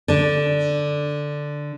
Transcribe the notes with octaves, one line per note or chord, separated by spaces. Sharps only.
D3 D4